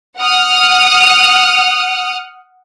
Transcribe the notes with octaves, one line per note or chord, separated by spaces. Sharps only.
F#5 D#6 F6